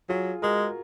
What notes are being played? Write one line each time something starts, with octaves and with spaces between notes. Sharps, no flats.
F#3 F4 G#4
G#3 F#4 A#4